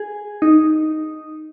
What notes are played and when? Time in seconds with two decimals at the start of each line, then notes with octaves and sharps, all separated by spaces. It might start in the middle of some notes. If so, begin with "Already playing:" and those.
Already playing: G#4
0.42 D#4